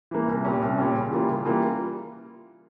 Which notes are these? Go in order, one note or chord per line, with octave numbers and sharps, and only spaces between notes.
E3 A#3
C2
A#2 G3 C#4
C2
A#2 G3 C#4
C#3
E3 G3 A#3 F4
C#3
E3 G3 A#3 F4